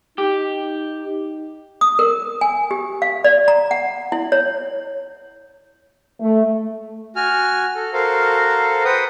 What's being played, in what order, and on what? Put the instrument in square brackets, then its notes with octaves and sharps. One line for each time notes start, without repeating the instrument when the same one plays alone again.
[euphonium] D#4 [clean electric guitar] G4
[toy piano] D#6
A#4
G#5
G4
F5
D5
A#5
F#5
E4
C#5
[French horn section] A3
[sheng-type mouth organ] F#4 G#5 F6
A4
F#4 A4 A#4 C5 F5
B4 C5 F#5 G5 D#6